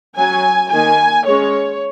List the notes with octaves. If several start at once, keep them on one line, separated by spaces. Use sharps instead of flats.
F#3 C#4 G#5
D#3 A#3 D#4 G#5
G#3 C#4 C#5